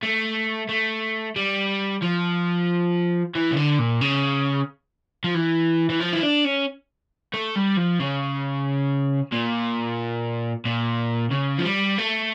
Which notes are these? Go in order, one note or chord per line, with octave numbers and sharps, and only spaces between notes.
A3
A3
G3
F3
E3
C#3
D3
A#2
C#3
F3
E3
E3
F3
E4
D4
C#4
A3
G3
F3
C#3
A#2
A#2
C#3
F3
G3
A3